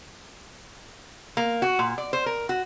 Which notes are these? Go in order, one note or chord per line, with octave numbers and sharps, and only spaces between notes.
A#3
F#4
A#2
D5
C5
A#4
F#4